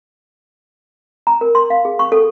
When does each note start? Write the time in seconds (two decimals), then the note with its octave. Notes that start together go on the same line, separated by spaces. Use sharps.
1.27 A#5
1.41 A#4
1.55 C6
1.70 F5
1.85 G#4
1.99 C#6
2.12 A4